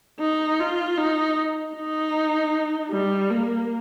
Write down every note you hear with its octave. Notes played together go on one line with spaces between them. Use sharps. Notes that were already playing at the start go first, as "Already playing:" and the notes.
D#4
F4
D#4
D#4
G3
A#3